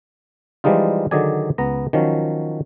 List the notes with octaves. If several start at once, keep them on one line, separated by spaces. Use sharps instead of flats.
E3 F3 G3 G#3 D#4 F4
D3 D#3 F#3 G#4 D5 G#5
C#2 B3 A#5
D#3 F3 F#3 C#4